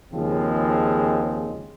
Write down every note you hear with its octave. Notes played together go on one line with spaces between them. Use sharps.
D#2 C#3 F3 G#3 C4